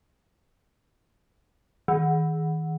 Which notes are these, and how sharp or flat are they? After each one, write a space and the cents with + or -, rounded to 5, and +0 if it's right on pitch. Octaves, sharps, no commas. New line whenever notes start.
D#3 +35